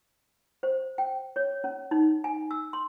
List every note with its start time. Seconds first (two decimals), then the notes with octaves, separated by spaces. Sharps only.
0.63 C5
0.98 G5
1.36 C#5
1.64 C#4
1.91 D#4
2.24 G#5
2.51 E6
2.73 C6